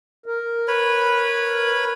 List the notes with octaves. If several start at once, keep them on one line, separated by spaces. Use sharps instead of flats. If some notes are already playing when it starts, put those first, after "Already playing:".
A#4
B4 C#5 B5